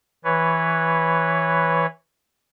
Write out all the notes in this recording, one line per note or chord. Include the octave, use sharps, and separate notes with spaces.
E3 B4 C#5